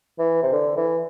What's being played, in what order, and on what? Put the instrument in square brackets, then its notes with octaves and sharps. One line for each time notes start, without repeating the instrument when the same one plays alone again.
[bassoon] E3
C3
D3
E3